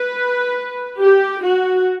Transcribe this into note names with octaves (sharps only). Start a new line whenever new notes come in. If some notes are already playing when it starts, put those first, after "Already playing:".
Already playing: B4
G4
F#4